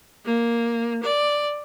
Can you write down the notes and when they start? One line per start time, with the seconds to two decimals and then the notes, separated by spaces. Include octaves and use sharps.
0.25 A#3
1.03 D5